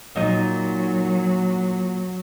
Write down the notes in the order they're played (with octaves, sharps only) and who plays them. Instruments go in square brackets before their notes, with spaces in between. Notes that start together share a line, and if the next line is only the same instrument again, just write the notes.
[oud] A#2 D#4 [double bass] F#3